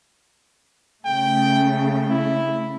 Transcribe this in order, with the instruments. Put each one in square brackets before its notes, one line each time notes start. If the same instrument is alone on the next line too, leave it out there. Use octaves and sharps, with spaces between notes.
[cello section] C#3 A3 [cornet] G5
[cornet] E4